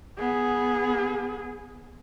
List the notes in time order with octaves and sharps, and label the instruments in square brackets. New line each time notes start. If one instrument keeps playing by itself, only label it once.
[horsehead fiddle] B3 G#4